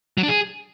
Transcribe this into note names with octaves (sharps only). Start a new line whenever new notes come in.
F#3
D4
G#4